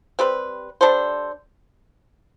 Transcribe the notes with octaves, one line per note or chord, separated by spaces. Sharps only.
G3 C4 G4 B4
G3 D4 A4 C5